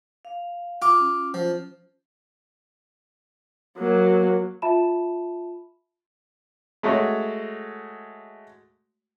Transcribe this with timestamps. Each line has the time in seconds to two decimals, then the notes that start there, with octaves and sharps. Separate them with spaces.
0.25 F5
0.82 F4 D6
1.00 C#4
1.34 F3
3.78 F#3 A#3
4.62 F4 E5 A5 B5 E7
6.83 G#3 A3 F#4 C#5